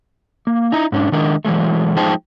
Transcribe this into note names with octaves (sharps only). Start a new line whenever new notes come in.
A#3
D#4 E4 A#5
G#2 C#4 D4
D#3 G#3 D4 A#4 D#5
E3 F#3 G#3 A3
F3 G#3 D#4 C5 G5 A5